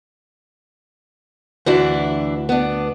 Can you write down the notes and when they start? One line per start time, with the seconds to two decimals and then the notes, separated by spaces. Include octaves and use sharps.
1.66 D2 E3 D4 E4 F#4
2.49 B3 D4